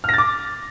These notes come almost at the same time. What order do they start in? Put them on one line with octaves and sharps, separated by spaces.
F6 A#6 A6 D6